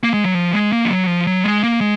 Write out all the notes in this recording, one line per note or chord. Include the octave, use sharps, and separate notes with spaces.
A#3
G#3
F#3
F3
G#3
A#3
F3
F#3
F3
F#3
G#3
A#3
G#3